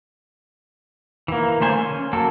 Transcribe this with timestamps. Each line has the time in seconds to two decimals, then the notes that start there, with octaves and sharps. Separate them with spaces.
1.28 E3 A#3
1.61 D3 A3 C5 G#5
1.75 C#4
2.13 F#3 A#3 A4